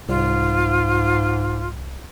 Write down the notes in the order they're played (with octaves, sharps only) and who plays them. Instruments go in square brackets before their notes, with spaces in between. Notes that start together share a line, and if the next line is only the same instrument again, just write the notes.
[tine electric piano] C2 [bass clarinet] G#2 [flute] F4